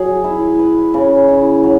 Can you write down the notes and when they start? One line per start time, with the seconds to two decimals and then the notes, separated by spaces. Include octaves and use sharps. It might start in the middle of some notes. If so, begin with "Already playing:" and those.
Already playing: F#3 G#4
0.24 E4
0.59 B4
0.94 C#3
1.28 E4
1.63 F#3